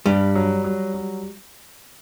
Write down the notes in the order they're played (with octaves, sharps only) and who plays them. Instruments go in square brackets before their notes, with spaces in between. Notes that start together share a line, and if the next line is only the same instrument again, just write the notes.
[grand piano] G2 [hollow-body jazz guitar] G3
[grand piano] F#3
F#3
F#3